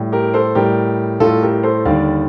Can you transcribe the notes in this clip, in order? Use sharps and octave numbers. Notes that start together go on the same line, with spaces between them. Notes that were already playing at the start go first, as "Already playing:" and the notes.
Already playing: A2 G3
G4 A#4
A4 C5
A2 G3 G4 A#4
A2 G3 F4 A4
G4 A#4
A4 C5
D#2 D3 G3 D5 F5